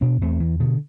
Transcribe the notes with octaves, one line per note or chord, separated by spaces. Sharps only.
B2 B3 D4
E2 A3 C4
E2 E3
B2 D3